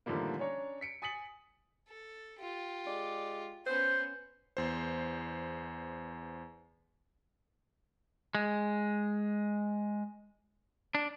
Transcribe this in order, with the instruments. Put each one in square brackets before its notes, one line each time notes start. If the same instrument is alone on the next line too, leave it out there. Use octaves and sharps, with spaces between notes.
[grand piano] A2 D3 D#3 F3 G3 A#3
C#4 D4 C#5 A#5
B6 C#7 D7
G#5 D#6 A6 B6 C#7 F#7
[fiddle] A4
F4 G4
[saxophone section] G#3 D5
[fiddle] B3 C#4 [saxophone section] C5
[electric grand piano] E2 C5
[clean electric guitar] G#3
D4